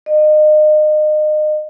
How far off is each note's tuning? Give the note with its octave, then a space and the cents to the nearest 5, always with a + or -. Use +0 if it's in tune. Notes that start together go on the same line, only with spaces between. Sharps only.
D#5 -30